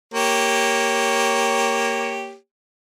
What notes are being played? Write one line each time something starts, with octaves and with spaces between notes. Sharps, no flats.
A#3 G4 C#5